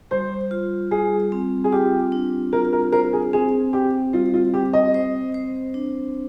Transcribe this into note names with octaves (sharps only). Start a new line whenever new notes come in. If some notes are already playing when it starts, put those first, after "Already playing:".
G3 C5
F4
G3 G#4
C4
G#4
F4 G4
D4
F4 A#4
A#4
A#4 C5
G#4
C4 G#4
C4 G4
G3 F4
F4
C4 G4
D#5
C5
C5
D4